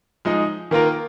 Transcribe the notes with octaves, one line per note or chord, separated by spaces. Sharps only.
F3 G#3 D#4
D#3 A#3 F4 A#4